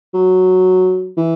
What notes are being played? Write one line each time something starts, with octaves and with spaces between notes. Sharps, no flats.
F#3
E3